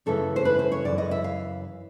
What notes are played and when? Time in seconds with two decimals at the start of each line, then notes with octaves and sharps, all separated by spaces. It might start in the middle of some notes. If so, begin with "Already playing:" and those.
0.06 F#2 C#3 E3 A3 C#4 A4
0.36 C5
0.45 B4
0.59 C5
0.72 C#5
0.85 F#2 C#3 E3 D5
0.98 D#5
1.11 E5
1.24 F5